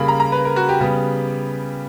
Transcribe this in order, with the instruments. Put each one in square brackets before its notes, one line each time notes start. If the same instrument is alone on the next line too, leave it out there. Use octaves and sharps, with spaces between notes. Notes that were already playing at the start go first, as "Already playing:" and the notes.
Already playing: [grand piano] C#3 G3 A#3 B5
A#5
A#5
B4
A#4
F#4
G4
C#3 G3 B3